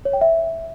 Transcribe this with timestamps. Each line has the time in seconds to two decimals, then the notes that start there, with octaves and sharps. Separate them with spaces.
0.05 C#5
0.13 G5
0.21 E5